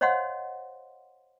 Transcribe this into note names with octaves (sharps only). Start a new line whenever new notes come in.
C5 C#5 D#5 F5 F#5 C6